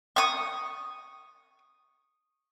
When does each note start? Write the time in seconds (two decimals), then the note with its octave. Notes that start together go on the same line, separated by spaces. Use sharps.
0.16 C#6 D#6